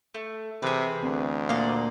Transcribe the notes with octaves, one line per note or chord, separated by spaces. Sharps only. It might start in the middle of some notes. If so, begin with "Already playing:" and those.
A3
C3 E3 G#4 B4
D2 C4
A#2 D5 D#5 F5